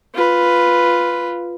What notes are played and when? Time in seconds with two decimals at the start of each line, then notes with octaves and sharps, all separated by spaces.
0.14 F4 B4